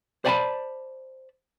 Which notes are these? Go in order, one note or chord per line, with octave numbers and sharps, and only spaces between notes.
C5 D5 F#5 G#5 A5 B5